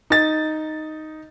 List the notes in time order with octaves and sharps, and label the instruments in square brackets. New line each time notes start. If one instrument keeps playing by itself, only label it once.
[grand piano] D#4 A6